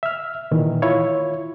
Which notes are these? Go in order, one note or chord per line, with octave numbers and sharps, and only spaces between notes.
E5 F6
A#2 D#3 E3
E4 F4 C#5